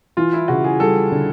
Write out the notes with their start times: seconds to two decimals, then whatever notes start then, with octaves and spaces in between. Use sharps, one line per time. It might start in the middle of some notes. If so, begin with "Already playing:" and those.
0.17 E3 F4
0.33 E4
0.48 C#3 F#4
0.64 G#4
0.80 G3 A4
1.12 D3